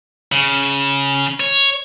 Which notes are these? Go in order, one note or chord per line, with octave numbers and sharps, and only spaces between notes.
C#3
C#5